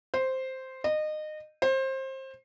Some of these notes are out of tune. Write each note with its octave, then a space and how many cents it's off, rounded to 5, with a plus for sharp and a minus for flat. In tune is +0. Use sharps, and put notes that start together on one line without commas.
C5 +0
D#5 -25
C5 +25